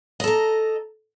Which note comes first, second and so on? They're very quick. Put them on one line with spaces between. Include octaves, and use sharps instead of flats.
D#5 A4 A#5